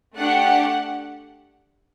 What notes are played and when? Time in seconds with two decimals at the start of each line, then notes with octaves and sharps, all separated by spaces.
0.16 A3 D4 G4 F#5